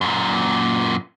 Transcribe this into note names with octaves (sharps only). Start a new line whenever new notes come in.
F#2 A#2